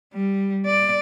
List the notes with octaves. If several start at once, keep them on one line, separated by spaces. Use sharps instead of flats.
G3
D5